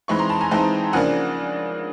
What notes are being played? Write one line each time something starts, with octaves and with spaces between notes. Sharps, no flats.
E3 G#3 C4 D#4 B5 C#6
A#5 C6
A5 B5
G#5 A#5
E3 G#3 C4 D#4 G5 A5
C#3 F3 A#3 D4 F#5 G#5